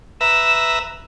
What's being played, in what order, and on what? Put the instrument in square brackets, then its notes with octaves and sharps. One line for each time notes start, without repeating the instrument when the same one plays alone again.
[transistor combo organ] B4 E5 A#5 [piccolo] E7